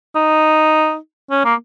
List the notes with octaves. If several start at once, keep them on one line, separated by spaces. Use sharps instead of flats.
D#4
C#4
A#3